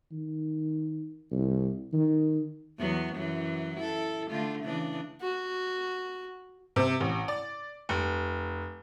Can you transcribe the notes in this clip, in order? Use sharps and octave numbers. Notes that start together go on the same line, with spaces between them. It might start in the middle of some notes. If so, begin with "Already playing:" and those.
D#3
C2
D#3
E2 F#3 B3
F#2 E3 F#3
E4 A4
D3 A3 F4
C#3 E3 D4
F#4
C3
A1
D5
F1